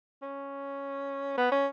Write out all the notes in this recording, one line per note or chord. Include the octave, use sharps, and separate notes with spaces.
C#4
B3
C#4